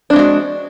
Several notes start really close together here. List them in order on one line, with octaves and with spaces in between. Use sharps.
D4 C4 G#3 F#4